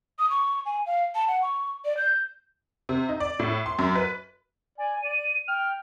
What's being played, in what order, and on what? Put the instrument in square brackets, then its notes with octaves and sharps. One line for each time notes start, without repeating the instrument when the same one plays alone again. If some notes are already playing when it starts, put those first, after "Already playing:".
[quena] D#6
C#6
G#5
F5
A5
F#5
C#6
D5
G6
[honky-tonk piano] C3
D#4
D5
A2
C6
F#2
B4
[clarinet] D5 [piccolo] G#5
[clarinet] D5 [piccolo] D#7
[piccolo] G5 [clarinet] F6